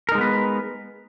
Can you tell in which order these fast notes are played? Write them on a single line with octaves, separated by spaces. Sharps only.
A#4 D#4 G#3 B3 B4